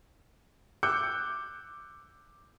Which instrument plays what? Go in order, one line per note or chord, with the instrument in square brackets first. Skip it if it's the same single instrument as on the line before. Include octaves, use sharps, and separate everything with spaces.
[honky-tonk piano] D6 E6 F#6 G6 C#7